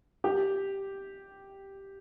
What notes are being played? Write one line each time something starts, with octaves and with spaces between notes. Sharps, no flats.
G4